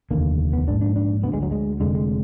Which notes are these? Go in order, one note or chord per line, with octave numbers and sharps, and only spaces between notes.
F1 D#2 D3 A#3
B3
A#1 G#2 D4
D4
D4
D2 D3 B3
G#3
F#3
G#3
F1 F2 D3 G#3
G#3